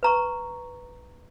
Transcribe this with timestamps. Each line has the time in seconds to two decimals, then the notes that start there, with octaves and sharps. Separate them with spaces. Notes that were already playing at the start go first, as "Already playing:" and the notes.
0.03 B4 A#5 C#6